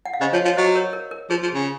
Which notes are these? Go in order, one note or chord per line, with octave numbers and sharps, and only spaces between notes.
F#5
F5
C#3 C5 D#5
F3 C#5 F5
F3 C#5 F5
F#3 C5 D#5
A#4 C#5
A#4
A#4
F3 G#4
F3
G#4
C#3